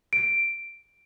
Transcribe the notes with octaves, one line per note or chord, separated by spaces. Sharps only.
D7